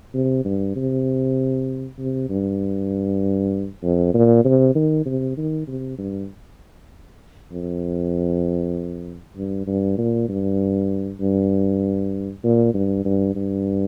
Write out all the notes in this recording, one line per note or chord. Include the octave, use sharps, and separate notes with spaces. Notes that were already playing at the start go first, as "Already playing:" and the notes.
C3
G2
C3
C3
G2
F2
A#2
C3
D#3
C3
D#3
C3
G2
F2
G2
G2
A#2
G2
G2
A#2
G2
G2
G2